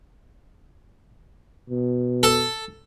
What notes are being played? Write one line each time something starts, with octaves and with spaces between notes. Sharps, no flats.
B2
A4